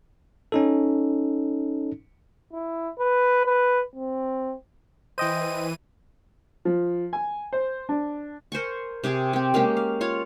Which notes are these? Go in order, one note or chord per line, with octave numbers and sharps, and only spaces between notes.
C#4 D#4 A4
E4
B4
B4
C4
E3 C5 D#5 G5 D#7
F3
G#5
C5
D4
A#4 C5 G#5 C#6
C3 G4 G#4 C5
C4 G4
G#3 A#3 C#4 G4
F5
F4 C#5 F5